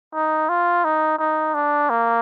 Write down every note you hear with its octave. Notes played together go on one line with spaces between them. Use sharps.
D#4
F4
D#4
D#4
D4
A#3